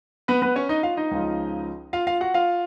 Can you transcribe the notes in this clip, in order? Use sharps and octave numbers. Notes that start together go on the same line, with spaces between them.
B3 B4
B3 B4
C#4 C#5
D#4 D#5
F4 F5
D#4 D#5
C#2 C#3 F3
F4 F5
F4 F5
F#4 F#5
F4 F5